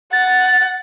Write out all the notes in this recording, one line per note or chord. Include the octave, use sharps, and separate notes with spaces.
F#5 A6